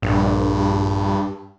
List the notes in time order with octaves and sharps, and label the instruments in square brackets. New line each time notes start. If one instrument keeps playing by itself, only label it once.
[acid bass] A#1 [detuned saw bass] G2